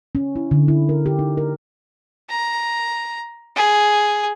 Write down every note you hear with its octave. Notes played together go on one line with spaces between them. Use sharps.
C#4
E4
D3
E4
A#4
G4
D#4
A#4
A#5
G#4